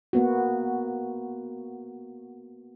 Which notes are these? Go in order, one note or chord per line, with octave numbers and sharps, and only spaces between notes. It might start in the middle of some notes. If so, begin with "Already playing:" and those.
A#3 B3 F#4